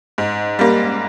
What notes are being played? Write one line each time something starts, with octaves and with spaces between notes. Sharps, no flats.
G#2
G3 A#3